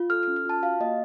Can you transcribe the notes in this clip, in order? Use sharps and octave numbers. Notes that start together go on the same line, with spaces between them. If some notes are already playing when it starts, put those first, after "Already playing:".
Already playing: F4
A4 F6
F6
C#4
F6
F4 A5
F#4 F5
A#3 D#5